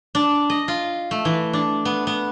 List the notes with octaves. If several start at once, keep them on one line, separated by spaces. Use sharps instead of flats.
D4
D#5
F4
A3
E3
D4
B3
B3